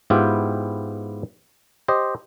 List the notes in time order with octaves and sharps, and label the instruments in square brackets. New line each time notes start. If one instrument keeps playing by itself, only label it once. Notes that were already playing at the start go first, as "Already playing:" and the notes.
[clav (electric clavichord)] G#2 B3 E4 F4 G4 G5
G4 C5 D#5